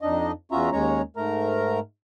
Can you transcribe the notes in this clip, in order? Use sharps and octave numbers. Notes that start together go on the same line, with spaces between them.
F2 D4 D#4 D#5
E2 C#4 F4 F#4 E5 A#5
D#2 G#3 C#4 C#5 A#5
G#2 A3 A#4 A#5